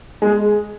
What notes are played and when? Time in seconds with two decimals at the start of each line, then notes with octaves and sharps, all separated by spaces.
0.22 G#3